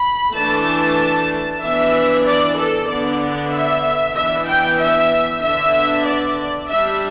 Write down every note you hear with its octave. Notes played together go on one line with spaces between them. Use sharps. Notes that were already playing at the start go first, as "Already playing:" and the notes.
Already playing: B5
E3 A3 D4 A5
E3 B3 D4 E5
D5
A4
D3 B3 D4 D5
E5
E3 B3 D4 E5
G5
E5
D3 B3 D4 E5
D5
G3 D4 E5